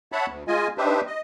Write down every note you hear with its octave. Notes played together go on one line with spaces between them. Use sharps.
C#5 E5 F#5 A5 B5
D2
G#3 F4 D#5 G#5
D4 D#4 G4 B4 C5 E5
D#5